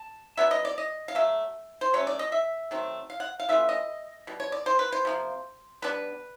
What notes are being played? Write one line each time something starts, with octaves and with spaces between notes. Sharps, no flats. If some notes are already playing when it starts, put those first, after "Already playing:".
Already playing: A5
F#3 B3 D4 E5
D#5
D5
D#5
F5
F#3 A3 E5
C5
F#3 A3 C#4 C#5
D5
D#5
E5
D#3 F#3 A3 C4
F5
F#5
F5
E3 A3 C#4 F4 E5
D#5
B2 G3
C#5
D5
C5
B4
C5
C3 F3 A#3
G3 B3 D4 B4